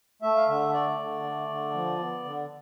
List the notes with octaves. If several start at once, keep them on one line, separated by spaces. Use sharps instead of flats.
A3 E5
F5
D3 E5
A3 D5
D3
A3
D3
F3
B3
D3